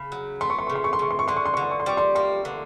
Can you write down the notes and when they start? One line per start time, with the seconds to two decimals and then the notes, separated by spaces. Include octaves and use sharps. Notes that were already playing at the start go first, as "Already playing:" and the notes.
Already playing: C#3 B5
0.12 F#3
0.41 A3 C6
0.50 C#6
0.59 C6
0.67 C#3 C#6
0.75 C6
0.84 C#6
0.93 C6
0.99 C#3 C#6
1.11 C6
1.19 C#6
1.28 D3 C6
1.36 C#6
1.45 C6
1.54 D3 C#6
1.62 C6
1.71 C#6
1.80 C6
1.86 G3 C#6
1.97 C6
2.15 A#3 C6
2.45 D3